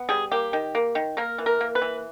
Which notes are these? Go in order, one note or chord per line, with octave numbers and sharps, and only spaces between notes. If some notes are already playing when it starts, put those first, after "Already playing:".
Already playing: B3
G3 G#4
A#3 G4
D#3
A#3
D#3
A#3 A#4
E3
A#4
A#3
B4
E3